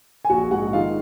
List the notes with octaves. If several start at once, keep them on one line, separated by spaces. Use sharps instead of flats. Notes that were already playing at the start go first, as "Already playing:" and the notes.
G#5
A#1 F#4 F#5
G#2 F#4 F#5
D#3 F4 F5